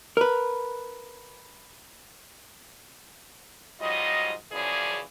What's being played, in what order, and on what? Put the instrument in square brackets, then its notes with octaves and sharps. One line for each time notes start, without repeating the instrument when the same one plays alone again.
[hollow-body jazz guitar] A#4 B4
[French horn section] G#2 F#3 G3 F4 D#5
F#2 C#3 E3 F3 G#4 D5